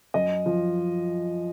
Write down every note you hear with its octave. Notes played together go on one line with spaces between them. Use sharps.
F#2 D#5
F3